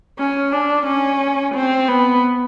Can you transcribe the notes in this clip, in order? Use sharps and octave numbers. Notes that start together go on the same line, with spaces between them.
C#4
D4
C#4
C4
B3